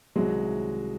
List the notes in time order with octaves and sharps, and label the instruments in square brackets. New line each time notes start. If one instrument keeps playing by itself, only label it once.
[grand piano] C2 C3 D#3 F#3 G#3